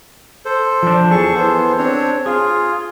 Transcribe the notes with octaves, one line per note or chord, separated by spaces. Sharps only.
A4 C5
F3 D4
E2 G#4 A4 C#6
E3 B3 C5
C4 D4 C#5
F4 G#4